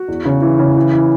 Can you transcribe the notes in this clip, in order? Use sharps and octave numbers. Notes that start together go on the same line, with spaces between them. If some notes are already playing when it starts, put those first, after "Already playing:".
Already playing: F#4
E2
C#3
E3
C#3
E3
E3